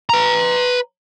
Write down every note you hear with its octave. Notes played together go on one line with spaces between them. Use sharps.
B4 A#5